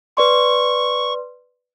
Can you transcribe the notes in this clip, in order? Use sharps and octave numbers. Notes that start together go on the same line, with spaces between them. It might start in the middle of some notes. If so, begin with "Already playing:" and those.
B4 D5 C6 C#6